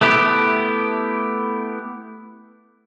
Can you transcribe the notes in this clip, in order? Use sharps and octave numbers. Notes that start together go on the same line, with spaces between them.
A3 B3 E4 G4